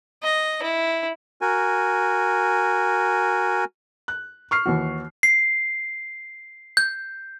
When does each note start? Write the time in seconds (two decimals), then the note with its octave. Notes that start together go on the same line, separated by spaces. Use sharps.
0.23 D#5
0.62 E4
1.41 F#4 A#4 G#5
4.08 F#6
4.51 C#6 F6 C7
4.66 D#2 E3 F#4
5.23 C7
6.77 G6